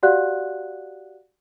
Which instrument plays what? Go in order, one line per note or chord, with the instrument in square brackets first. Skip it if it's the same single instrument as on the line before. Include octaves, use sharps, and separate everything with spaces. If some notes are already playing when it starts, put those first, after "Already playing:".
[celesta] F#4 G4 D5 F5 F#5 F#6